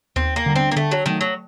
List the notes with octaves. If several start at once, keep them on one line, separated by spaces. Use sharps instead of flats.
D#2 C4
A#3
D3 G3 D4
C4
A#3
D3 A3
F#3
D#3 F#3 A3
F#3